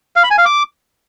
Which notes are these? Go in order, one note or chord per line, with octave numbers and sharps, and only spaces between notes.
F5
B5
G#5
F5
D6